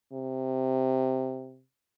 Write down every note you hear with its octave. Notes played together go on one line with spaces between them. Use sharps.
C3